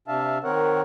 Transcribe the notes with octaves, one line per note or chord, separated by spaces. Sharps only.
C3 D4 E5 F5 A5
D#3 C4 A#4 C#5 F#5